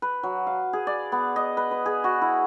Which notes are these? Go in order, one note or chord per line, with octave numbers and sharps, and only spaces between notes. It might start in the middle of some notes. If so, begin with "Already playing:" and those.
B4
F#3
F5
G#4
D5
B3
D#5
B4
B4
G#4
F#4
E4